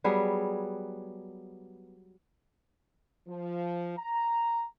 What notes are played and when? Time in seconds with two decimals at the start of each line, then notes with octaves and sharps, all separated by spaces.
0.04 F#3 G3 B3 G#4
3.28 F3
3.98 A#5